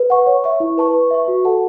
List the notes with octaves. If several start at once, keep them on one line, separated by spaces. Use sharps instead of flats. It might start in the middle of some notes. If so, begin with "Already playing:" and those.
Already playing: B4
F#5 C#6
C#5
E5 C#6
E4
B4 A5 C#6
B4
E5 C#6
F#4
A4 F#5 A5